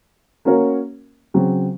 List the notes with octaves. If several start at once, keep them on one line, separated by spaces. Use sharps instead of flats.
A#3 C#4 F#4 A#4 C#5
C#3 F#3 C4